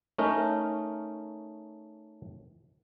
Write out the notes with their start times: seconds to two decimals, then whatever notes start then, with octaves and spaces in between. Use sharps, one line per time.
0.18 A3 C#4 D#4 A#4